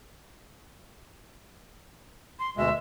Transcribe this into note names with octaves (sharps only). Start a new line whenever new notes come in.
C6
D2 B2 G#3 E5